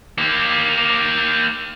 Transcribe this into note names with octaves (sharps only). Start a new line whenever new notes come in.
A#3 G4